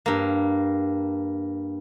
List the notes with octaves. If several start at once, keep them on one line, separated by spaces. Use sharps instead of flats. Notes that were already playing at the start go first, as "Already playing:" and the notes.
G2 A#3